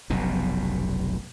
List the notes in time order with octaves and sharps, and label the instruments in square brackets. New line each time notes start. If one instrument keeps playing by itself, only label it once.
[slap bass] F1 B1 G2 B2